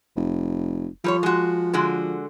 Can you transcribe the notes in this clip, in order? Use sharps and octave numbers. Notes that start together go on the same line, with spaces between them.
F1
F3 G3 B4 C#5
G#3 F#4
D3 G#3 F#4